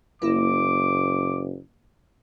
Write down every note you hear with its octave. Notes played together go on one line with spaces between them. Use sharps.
F#1 A#3 E4 D6